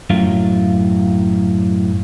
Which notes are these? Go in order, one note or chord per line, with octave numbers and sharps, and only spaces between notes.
F#2 A2 F#3 F4